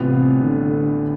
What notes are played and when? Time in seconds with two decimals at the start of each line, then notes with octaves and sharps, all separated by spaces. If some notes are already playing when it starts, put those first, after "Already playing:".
Already playing: A1 A2 C3 G3 B3 F4
0.42 D3